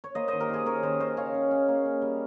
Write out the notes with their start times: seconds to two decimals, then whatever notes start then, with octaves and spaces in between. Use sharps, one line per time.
0.04 C#5
0.15 A#3 C5 D#5
0.28 D#3 C5 D#5
0.40 G4 A#4
0.49 D#3 G#4 C5
0.66 C#4 A#4 C#5
0.83 D#3 C5 D#5
1.00 C#4 C5 D#5
1.17 C#3 C#5 F5
1.34 C#3
1.51 C#4
1.68 A#3
1.85 C#4
2.02 G3